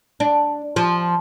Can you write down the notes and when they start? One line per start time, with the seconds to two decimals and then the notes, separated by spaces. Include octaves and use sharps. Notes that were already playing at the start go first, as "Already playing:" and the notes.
0.20 D4
0.76 F3